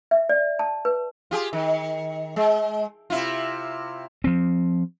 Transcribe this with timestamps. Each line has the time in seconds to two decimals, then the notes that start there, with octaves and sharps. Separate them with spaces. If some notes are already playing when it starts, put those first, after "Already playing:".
0.11 E5
0.29 D5
0.59 A5
0.85 B4
1.31 F4 G4 G#4
1.53 D#3
2.36 G#3
3.10 C3 E4 F4
4.24 F3 C4